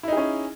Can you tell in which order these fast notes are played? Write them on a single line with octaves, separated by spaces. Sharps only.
E4 D#4 G#4 C#4